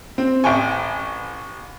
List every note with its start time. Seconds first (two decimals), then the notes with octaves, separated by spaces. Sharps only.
0.18 C4
0.44 A1 G5 G#5 C#6